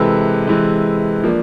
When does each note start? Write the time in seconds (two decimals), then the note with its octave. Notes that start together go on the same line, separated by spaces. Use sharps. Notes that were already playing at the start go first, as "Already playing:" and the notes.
Already playing: C3 E3 G#3 A4 B4
0.47 C3 E3 G#3
1.23 F3 A#3 D4